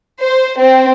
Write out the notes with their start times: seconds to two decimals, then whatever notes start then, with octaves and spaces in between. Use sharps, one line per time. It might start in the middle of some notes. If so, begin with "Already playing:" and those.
0.22 C5
0.60 C4